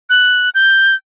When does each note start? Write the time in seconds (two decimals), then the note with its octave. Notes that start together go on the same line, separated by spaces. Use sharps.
0.10 F#6
0.55 G6